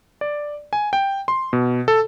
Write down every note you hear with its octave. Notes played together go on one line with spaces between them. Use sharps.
D5
G#5
G5
C6
B2
A4